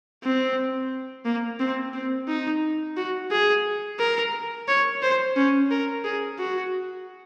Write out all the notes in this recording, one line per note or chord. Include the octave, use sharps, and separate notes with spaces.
C4
A#3
C4
C4
D#4
F#4
G#4
A#4
C#5
C5
C#4
A#4
G#4
F#4